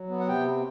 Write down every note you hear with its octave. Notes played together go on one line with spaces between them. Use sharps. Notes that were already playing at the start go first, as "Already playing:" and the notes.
Already playing: F#3
B3
F#5
C3 G5